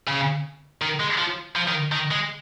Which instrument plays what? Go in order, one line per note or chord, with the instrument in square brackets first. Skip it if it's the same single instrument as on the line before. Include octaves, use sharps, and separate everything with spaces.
[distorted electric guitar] C#3
D#3
G#3
F3
F3
D#3
D#3
G#3